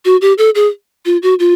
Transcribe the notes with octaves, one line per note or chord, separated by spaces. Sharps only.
F#4
G4
A4
G#4
F4
F#4
F4